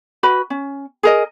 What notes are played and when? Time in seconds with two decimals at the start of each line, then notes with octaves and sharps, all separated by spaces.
0.23 F#4 B4 B5
0.50 C#4
1.03 G#4 A#4 D#5